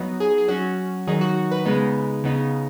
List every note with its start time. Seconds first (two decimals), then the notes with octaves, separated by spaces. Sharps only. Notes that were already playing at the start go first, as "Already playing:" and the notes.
Already playing: F#3 B3 D#4
0.20 G#4
0.38 G#4
0.48 F#3 C#4 F#4
1.07 D#3 F#3 D#4 G#4
1.21 F#4
1.51 B4
1.65 C#3 G#3 B3 D#4
2.24 C#3 B3 D#4